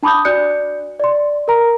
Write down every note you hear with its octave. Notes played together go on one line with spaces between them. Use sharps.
D4 A5 B5 D6 D#6 G6
D4 F#4 D5 F#6 G6 C#7
D5 C6
A#4 A#5